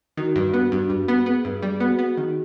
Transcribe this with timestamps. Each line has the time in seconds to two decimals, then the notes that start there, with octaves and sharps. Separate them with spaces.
0.17 D#3 F#4
0.36 G2
0.54 B3
0.72 G2
0.90 G2
1.08 B3
1.26 B3 G#4
1.45 G2
1.62 G3
1.80 B3 F#4
1.99 B3
2.17 D#3